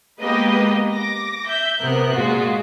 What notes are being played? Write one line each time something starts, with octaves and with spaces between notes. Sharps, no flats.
G#3 A#3 B3 G4 B4 D#5
D6 A#6
E5 G6
C3 B3 A#4 F#6
A#2 G#3 F4 F#4